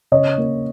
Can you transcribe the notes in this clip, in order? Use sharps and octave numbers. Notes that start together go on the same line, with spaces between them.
C#3 C#5 D#5
A#3